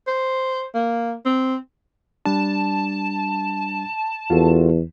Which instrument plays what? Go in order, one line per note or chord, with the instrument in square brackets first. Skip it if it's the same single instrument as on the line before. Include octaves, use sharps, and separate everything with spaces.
[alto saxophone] C5
A#3
C4
[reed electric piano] G3 D4 [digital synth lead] A5
[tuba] E2 [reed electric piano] F4 F#4 A4